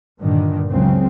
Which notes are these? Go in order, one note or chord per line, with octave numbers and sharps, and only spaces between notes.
G2 A#2 D3 D#3
F#1 C#2 C#3 F#3 C4